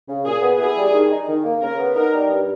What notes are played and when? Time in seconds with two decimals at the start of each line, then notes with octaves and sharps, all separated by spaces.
0.08 C#3
0.25 A#2 G#4
0.42 B3
0.59 E4 G#4
0.76 G3
0.93 D#3
1.11 D#4
1.28 D#3
1.44 A#3
1.61 C#3 A#4
1.79 B3
1.96 D#4 A#4
2.13 G3
2.30 G2